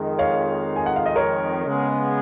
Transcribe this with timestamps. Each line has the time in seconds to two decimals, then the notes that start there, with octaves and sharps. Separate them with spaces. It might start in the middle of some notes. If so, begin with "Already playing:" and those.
Already playing: F2 D#3 G#3
0.19 C#5 F5
0.76 G#5
0.86 F#5
0.96 F5
1.06 D#5
1.16 A#4 C#5
1.66 C#3 G#3 B3